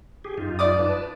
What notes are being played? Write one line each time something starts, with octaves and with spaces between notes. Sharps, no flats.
G4 G#4
F#2 D#4 F4
D5 D6 D#6
B4 A5